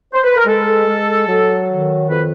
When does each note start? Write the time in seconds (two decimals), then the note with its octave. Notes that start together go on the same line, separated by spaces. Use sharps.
0.13 C5
0.24 B4
0.36 A#4
0.46 G#3 A4
0.86 G#3
1.27 F#3
1.67 D#3
2.08 F2 B4